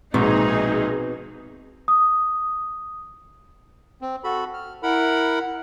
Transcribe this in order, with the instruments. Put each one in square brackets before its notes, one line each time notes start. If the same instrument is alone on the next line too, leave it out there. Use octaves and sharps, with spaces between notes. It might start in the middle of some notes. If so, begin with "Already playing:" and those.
[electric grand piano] A#1 G#2 [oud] B2 [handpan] C4 [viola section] D#4 G#4
[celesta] D#6
[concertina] C4
F#4 A4 B5
F6
E4 A#4 F#5 B5